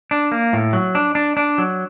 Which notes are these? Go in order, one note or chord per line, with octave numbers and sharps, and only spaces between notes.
D4
A#3
A2
F#3
D4
D4
D4
F#3